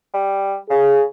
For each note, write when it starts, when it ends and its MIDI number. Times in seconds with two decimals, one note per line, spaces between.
0.14 0.56 55
0.70 1.03 49
0.70 1.04 68